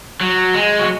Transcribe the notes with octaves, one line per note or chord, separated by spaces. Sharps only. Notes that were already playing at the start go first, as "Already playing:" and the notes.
F#3
G#3
F#3